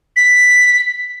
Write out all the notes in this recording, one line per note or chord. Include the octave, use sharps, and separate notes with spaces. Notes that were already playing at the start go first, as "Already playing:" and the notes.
B6